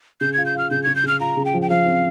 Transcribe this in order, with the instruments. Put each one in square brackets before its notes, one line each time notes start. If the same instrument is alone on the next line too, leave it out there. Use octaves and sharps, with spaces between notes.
[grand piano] C#3 [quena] G6
[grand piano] F4 [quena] G#6
[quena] G6
[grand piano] F4 [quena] F6
[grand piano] C#3 [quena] G6
[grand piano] C#3 [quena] G#6
[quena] G6
[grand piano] C#3 [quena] F6
[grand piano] F4 [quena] A#5
[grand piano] C#3
[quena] G5
[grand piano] F3
[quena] G5
[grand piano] F3 [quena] F5
[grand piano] C4